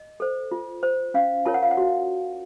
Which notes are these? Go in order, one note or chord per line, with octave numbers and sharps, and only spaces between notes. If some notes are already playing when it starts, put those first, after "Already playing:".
Already playing: D#5
A4 C5
F4
C5
C#4 F5
F4 A#4 C#5 A5
F#5
F5
F#5
F#4